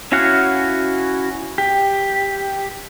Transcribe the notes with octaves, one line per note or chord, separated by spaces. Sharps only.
C#4 E4 F#4 F5 F#5
G4